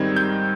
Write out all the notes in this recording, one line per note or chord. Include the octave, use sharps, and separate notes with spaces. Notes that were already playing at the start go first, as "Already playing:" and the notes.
Already playing: G#2 D#3 G3 C4 D#4 G#6
G6